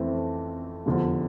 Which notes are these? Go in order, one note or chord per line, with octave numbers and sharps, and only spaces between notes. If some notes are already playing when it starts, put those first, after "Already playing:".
Already playing: F2 E3 A3 C4
F1 E2 D3 F3